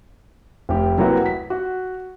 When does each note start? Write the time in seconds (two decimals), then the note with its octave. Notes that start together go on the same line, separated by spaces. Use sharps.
0.69 F1 G4
0.98 C3 F#3 A#3 E4 F#4 B4
1.26 B6
1.50 F#4